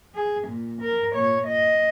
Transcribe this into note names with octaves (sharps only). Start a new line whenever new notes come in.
G#4
A#2
A#4
A#2 C#5
D#5